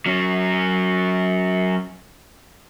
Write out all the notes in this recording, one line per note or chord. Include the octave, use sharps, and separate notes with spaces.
F#3 C#4